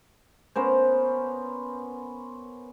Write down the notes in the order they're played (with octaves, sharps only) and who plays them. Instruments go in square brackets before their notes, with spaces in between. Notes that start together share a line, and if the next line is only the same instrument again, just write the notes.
[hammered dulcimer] B3 C#4 A#4 C5